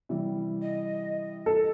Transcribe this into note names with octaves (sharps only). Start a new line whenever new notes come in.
C3 E3 G3
D#5
A4